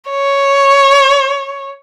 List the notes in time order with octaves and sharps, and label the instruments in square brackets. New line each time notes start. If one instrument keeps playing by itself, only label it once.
[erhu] C#5